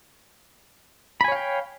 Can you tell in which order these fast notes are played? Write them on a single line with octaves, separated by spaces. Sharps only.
B5 G#5 C#5 F5 G5